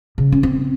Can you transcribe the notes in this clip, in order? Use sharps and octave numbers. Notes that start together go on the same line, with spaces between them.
C#3
C#4
C4